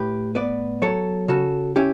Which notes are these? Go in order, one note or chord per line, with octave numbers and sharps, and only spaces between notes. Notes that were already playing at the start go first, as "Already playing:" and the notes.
Already playing: A2 G4 B4
B3 B4 D5
F#3 A4 C#5
C#3 F#4 A4
C#4 E4 G4